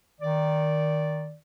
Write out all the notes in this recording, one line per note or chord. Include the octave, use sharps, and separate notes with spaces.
D#3 D5